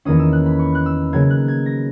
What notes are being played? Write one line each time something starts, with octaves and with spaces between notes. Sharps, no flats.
E2 D#3 A#3 C#4 D#6
E6
F#6
B5
C#6
F#6
E6
C#3 F#3 A#3 G#6
F#6
G#6
A#6